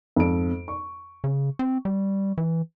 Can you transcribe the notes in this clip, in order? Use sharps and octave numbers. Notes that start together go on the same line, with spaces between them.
F2 G#2 D7
C#6
C#3
C4
G3
E3